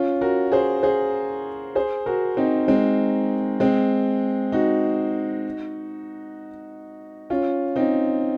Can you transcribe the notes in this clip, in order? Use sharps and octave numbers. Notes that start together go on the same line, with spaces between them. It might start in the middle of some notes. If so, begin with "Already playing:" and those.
Already playing: C#4 F4
F#4 A#4
G#4 C5
G#4 C5
G#4 C5
F#4 A#4
C4 D#4
G#3 C4
G#3 C4
D#4 F#4
C#4 F4
C4 D#4